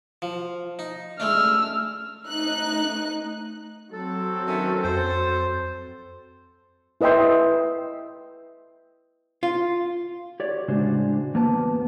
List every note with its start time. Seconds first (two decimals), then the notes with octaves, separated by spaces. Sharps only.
0.22 F3
0.79 D#4
1.20 G#3 A3 D4 E6 F6
2.28 A3 D#4 F#6
3.93 F#3 C4 A4
4.48 D#3 A3 C#4
4.84 F2 C5
7.01 E4 B4 D#5 E5 G5 C6
9.43 F4
10.40 G4 C#5 D5
10.68 A2 C#3 G#3 D4 F#4 C5
11.34 E2 A#3 B3 C5 A5